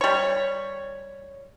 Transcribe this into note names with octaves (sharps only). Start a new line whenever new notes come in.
G3 C#5